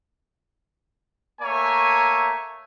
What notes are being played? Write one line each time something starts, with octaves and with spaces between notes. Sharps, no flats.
A3 A#3 C#5 E5 G#5 A#5